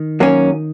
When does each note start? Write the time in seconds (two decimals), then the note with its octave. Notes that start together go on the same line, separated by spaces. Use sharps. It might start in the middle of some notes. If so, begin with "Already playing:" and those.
Already playing: D#3
0.20 F#3 A#3 C#4